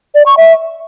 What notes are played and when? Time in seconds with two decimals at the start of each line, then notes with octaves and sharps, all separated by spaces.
0.15 D5
0.26 C#6
0.37 E5